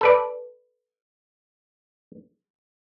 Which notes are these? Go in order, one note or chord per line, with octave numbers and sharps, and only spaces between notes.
A4 B4 D5